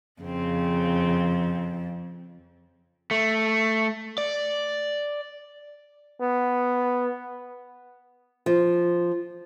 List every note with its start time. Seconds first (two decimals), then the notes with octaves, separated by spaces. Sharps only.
0.21 F2 C#3 C4
3.11 A3
4.18 D5
6.21 B3
8.46 F3